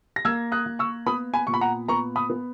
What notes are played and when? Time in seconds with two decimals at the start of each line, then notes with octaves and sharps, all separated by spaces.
0.16 A#6
0.25 A#3 E6 G#6
0.52 D#6 F#6
0.66 A#3
0.79 C#6 E6
1.06 B3 B5 D#6
1.34 G#5 B5
1.47 A#2 C#6
1.54 B5
1.61 F#5 A#5
1.88 B3 A#5 C#6
2.16 B5 D#6
2.30 B3